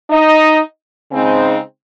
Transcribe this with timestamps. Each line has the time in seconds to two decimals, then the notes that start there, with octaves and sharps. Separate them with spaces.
0.11 D#4 D#5
1.10 C#3 G#3 C4 D#4